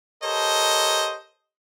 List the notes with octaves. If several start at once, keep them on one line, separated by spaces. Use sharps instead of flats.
G4 A4 A#4 C5 C#5 D#5